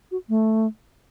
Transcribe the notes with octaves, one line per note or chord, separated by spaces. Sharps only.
F#4
A3